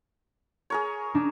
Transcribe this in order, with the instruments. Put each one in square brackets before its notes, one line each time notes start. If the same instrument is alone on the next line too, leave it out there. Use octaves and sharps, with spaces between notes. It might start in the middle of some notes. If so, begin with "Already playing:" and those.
[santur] G#4 A#4 C#5
[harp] D4 D#4